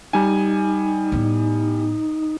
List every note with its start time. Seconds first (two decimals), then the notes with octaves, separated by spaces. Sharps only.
0.13 G3 D#4 G#5
1.12 A2 B3